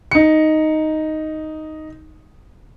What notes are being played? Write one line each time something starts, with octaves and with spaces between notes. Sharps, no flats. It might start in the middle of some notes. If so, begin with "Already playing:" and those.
D#4 C#7